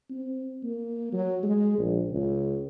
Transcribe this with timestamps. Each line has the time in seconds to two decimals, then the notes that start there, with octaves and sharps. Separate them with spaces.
0.10 C4
0.64 A#3
1.13 F#3
1.43 G#3
1.78 A#1
2.10 C#2